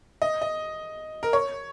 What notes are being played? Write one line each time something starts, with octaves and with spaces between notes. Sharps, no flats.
D#5
D#5
A#4
C#5